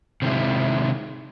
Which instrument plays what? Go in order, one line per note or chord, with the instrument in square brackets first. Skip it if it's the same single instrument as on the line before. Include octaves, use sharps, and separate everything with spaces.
[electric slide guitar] C3 D#3 G#3 E4